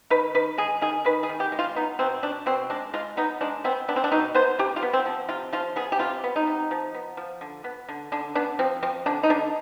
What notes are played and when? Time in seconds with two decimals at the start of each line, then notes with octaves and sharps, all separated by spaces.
0.10 D#3 B4
0.34 D#3 B4
0.58 G#3 G#4
0.82 D#3 G#4
1.05 D#3 B4
1.23 G#4
1.29 D#3
1.40 G4
1.52 G#3
1.59 F4
1.76 B3 D#4
1.99 B2 C4
2.23 B2 D4
2.46 B2 C4
2.70 G#3 D4
2.93 G#3 F4
3.17 B3 D#4
3.41 G#3 D4
3.64 B3 C4
3.88 B3 D4
3.96 C4
4.04 D4
4.12 B2 D#4
4.35 B3 C5
4.59 C3 G4
4.76 F4
4.82 B3
4.93 C4
5.06 F3
5.28 C3 F4
5.53 F3 F4
5.76 B3 G#4
5.92 G4
5.99 C3 F4
6.24 B3
6.36 D#4
6.47 C3
6.71 F3
6.94 B3
7.17 F3
7.41 D3
7.64 B3
7.89 D3
8.12 D3 D4
8.35 B3 D4
8.59 F3 C4
8.83 F3 C4
9.06 D3 D4
9.23 D#4
9.29 D3 D4